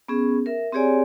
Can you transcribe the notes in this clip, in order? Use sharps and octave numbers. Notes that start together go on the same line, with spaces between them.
B3 C#4 G#4
A#4 E5
C4 G4 G#4 C#5 D5 G#5